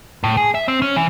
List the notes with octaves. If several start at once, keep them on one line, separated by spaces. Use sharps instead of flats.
A2
G#4
E5
C4
C#4
E3